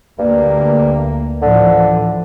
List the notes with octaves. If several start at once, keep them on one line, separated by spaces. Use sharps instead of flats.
D2 G2 A#3
A2 D3 E3 F3